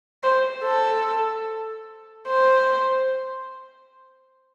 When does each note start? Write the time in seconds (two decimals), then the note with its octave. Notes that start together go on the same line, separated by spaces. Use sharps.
0.23 C5
0.63 A4
2.28 C5